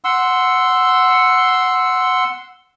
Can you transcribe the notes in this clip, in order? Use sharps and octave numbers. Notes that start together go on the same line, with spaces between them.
F#5 C6 E6